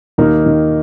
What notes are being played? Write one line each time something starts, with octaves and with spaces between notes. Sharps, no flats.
D#2 A#3 D#4
D#3